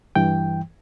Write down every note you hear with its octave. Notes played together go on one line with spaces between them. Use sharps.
G2 E3 G5